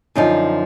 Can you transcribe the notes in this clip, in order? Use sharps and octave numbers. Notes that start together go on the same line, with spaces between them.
F#2 D3 F3 D#4